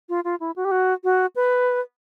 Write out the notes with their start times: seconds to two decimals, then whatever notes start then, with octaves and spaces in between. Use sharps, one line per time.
0.09 F4
0.24 F4
0.40 E4
0.56 F#4
0.65 G4
0.71 F#4
1.04 F#4
1.36 B4